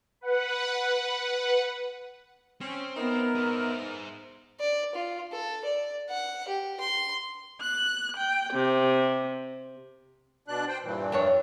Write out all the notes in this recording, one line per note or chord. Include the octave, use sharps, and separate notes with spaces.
B4 F#5
C4 C#4
B3 D#4 A#4 E5
G#4 C5
D5
F4
A4
D5
F#5
G4
C6
F#6
G5
C3
B2 D4 F#6
C5 G5
G2 A#2 E3
F2 D4 C#5